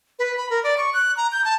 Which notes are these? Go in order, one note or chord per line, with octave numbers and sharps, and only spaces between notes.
B4
B5
A#4
D5
C#6
F#6
A#5
G6
A5